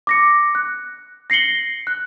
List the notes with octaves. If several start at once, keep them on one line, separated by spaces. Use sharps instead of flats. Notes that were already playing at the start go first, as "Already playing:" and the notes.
D6 A#6 C#7
F#6
A#6 C7 C#7 F#7 G7
F#6